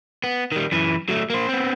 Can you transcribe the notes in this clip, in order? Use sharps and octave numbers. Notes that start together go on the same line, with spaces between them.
B3
D#3 G3
F#2 E3
F#3 A3
A#3 C5
B3 C4